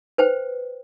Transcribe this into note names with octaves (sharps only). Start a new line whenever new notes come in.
B4 C5 G5